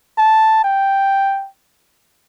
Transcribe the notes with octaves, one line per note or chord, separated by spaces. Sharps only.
A5
G5